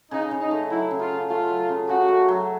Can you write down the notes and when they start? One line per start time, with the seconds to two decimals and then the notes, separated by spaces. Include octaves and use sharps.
0.11 C#3 D#4
0.31 C#3
0.41 D#4
0.51 A3
0.70 F#3 E4
0.91 C#3
1.01 F4
1.11 C#3
1.30 A3 F4
1.50 F#3
1.69 C#3
1.89 C#3 F#4
2.08 A3
2.28 F#3